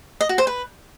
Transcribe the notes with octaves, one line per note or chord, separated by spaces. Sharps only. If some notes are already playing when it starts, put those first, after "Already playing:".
D#5
F#4
C5
B4